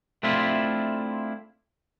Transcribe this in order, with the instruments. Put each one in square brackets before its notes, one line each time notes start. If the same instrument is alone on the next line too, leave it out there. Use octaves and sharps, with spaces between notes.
[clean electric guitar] A3 C4 D4 E4 F4 E5